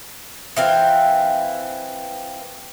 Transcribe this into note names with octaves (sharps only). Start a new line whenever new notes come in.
E3 C4 F5